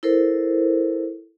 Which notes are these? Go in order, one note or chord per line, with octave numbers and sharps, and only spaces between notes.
E4 A4 A#4 C5